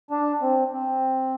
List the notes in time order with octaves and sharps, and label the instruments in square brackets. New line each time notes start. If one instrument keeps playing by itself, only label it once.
[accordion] D4
C4
C4